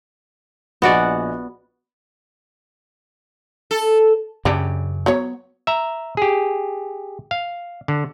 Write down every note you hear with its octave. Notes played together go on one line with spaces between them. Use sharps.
A#1 B3 F#4 D5 D#5 G#5
A4
F#2 C#3 D4 G4 D5
F#3 B3 C#5
E5 A#5
G4 G#4
F5
D3